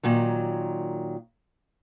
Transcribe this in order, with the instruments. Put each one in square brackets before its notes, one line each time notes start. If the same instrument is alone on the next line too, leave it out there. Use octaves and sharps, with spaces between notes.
[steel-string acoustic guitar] A#2 D#3 F#3